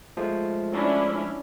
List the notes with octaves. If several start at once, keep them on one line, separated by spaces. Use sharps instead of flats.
F3 G#3 A3
C#4 D4 E4